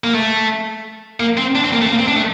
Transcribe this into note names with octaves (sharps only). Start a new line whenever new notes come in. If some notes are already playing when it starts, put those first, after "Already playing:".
A#3
A3
A#3
C4
D4
C4
A#3
A3
C4
A#3
C4
D4
A3